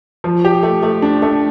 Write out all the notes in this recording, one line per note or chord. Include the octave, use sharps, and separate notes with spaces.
F3
G4
A3
A3
D4
A3